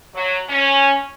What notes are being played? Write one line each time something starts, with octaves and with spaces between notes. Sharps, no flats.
F#3
C#4